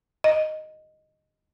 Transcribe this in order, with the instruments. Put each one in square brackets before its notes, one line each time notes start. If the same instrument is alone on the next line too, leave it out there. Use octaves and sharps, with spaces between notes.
[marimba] D#5